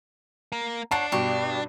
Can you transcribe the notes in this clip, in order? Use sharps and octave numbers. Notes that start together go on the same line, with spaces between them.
A#3
D4 C#5 F#5 A5 C7
G2 B2 G4 C#6